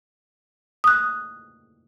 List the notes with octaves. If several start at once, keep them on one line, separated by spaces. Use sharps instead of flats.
D#6 F#6